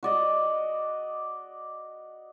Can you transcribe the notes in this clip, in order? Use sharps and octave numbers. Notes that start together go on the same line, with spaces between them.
F#4 D5 D#5